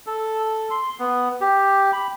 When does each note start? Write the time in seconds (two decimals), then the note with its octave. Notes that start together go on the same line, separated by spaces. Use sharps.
0.07 A4
0.71 C6
0.99 B3
1.41 G4
1.93 B5